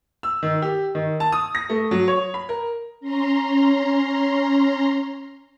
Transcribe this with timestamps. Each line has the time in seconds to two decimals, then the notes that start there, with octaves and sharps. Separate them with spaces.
0.23 E6
0.43 D#3
0.62 G4
0.95 D#3
1.20 A5
1.32 D#6
1.55 A#6
1.69 A3
1.91 F#3
2.08 C#5
2.34 B5
2.49 A#4
3.00 C#4 A#5 C6